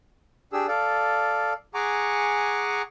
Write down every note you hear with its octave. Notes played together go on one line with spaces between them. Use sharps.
D4 G4 G#4 E6
A4 D5 F5
G#4 F#5 G#5 A#5 C#6 D6